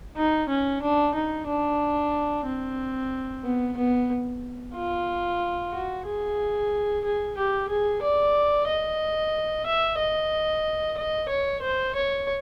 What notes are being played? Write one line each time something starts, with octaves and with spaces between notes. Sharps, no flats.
D#4
C#4
D4
D#4
D4
C4
B3
B3
F4
F#4
G#4
G#4
G4
G#4
D5
D#5
E5
D#5
D#5
C#5
C5
C#5